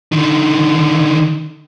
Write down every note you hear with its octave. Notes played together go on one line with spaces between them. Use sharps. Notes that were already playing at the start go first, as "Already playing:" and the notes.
D3 D#3